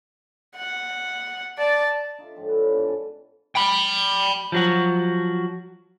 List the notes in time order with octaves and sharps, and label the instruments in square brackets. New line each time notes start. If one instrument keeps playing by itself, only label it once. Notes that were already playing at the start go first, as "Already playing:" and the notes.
[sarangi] F#5
[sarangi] D5 [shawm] A5
[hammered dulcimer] D#4 F4 D5 E5
A2 D3 F3 G#3
B4 D5 G5
G#2 B2 D4 E4
C4 A4 F#5 G#5
[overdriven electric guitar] G5 B5
[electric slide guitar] F3 F#3 F#4